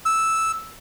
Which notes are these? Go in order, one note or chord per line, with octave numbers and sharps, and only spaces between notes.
E6